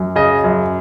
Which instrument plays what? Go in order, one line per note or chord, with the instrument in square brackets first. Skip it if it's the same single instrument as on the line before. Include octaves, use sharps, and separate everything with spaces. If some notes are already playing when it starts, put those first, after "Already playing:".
Already playing: [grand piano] F#2
C#3 D#5
F#2